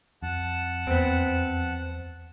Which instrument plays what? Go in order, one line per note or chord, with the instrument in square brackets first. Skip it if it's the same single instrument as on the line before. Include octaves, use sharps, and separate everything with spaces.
[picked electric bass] F2 [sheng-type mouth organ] F#5 A5
[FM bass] E2 [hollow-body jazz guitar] B3 C4